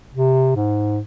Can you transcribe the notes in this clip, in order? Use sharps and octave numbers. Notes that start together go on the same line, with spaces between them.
C3
G#2